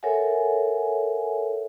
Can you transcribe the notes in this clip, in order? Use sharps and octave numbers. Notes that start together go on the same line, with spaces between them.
A4 A#4 C#5 E5 F#5 G#5